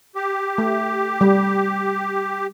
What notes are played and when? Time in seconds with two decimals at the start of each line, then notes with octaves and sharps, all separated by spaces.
0.15 G4
0.58 A3
1.21 G3